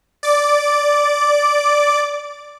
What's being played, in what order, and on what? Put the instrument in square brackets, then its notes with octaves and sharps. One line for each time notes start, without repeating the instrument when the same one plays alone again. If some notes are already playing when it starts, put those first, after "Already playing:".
[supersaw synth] D5 D6